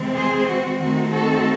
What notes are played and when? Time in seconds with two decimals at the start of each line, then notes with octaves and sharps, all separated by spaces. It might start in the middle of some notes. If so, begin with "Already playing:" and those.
Already playing: C3 E3 G#3 C4
0.14 G#4 C5
0.47 F#4
0.79 D#3 A3 C4 D#4 F#4
1.12 F#4 A4